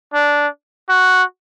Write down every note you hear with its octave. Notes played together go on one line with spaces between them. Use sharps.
D4
F#4